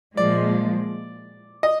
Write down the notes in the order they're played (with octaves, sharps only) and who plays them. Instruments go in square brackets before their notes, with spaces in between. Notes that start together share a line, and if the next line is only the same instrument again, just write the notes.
[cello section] A#2 F3 G#3 [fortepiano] D5
[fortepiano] D#5